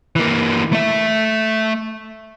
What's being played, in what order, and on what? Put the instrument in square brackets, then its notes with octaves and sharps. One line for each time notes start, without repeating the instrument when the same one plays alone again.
[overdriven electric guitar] E3 A#3
A3 E5